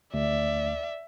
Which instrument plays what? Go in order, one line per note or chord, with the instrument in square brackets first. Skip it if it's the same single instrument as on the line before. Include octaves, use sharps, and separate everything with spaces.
[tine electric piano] D2 [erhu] D5 [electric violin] E5